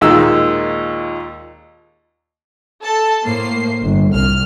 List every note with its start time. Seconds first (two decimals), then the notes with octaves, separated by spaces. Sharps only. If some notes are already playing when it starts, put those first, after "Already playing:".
0.01 D#2 A#2 G#3 D#4 E6
2.83 A4 A5
3.24 A2 A#3 C5 C7
3.83 G1
4.12 C2 F6